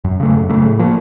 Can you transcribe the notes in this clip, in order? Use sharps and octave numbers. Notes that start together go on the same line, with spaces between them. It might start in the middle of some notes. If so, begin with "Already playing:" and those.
F#2
C#3 A3
F#2
C#3 A3
A2
F3 A#3